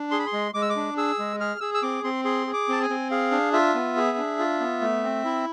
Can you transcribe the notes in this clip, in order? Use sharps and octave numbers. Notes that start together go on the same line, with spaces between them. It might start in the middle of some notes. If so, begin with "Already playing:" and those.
Already playing: D4
G#4 C6
B5
C6
G#3
G#3 D6
E6
D6
D4
G#4 E6
G#3
G#4 F6
G#4 E6
E6
C4 D6
C4 C6
G#4 C6
G#4
D6
C4 A5
G#5
C4
G#4 F5
D4
F4 E5
B3
G#4
D4
F4
B3
A3
C4
E4